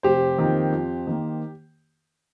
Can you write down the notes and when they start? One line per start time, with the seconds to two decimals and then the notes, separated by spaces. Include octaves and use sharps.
0.03 F1 G4 C5
0.38 F2 D#3 A#3
0.72 F2
1.07 D#3 A#3